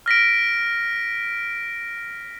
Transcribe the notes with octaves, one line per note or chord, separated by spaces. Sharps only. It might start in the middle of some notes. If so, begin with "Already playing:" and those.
F6 A#6 B6 D7